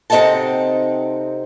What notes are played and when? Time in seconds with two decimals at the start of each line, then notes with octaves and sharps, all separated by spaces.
0.10 C3 C4 D#4 A4 F#5 A5